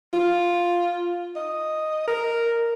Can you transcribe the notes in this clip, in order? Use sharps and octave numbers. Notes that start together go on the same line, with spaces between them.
F4
D#5
A#4